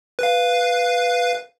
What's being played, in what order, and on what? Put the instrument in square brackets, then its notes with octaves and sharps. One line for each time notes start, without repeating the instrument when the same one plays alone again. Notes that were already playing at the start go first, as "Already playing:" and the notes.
[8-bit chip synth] B4 F5